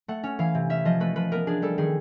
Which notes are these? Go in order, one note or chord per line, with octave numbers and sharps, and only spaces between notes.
A3 F#5
C#4
E3 F5
C3
C#4 E5
F3 D#5
A3 B4
F3 B4
B3 A#4
D4 G#4
G3 A4
D#3 G#4